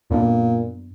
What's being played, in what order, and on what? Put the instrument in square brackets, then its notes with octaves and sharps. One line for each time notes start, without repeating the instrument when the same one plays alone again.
[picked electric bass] F#2 B3 D4 [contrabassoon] A#2